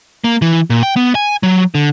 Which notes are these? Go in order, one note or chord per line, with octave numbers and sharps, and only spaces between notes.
A#3
E3
A#2
G5
B3
G#5
F#3
D3